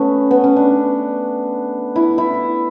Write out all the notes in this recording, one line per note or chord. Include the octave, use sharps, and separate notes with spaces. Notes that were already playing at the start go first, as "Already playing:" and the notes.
Already playing: A3 B3 C#4
B3
C#4
D4
E4
E4